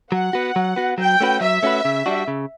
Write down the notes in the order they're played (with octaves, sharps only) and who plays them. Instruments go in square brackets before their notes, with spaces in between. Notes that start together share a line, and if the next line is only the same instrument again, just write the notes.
[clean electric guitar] F#3 [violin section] F#5
[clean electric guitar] B3 F#4
F#3
B3 F#4
[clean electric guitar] F#3 [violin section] G5
[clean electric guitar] A3 C#4 F#4 B4
[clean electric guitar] F#3 [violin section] E5
[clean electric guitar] A3 C#4 F#4 B4
C#3
G3 D4 F#4
C#3